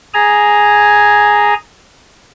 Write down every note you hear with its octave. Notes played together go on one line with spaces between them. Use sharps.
G#4 G#5 A#5